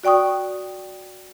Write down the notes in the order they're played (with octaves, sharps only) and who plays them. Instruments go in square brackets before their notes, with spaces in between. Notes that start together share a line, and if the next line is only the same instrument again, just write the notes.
[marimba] F#4 D5 G5 C#6 D#6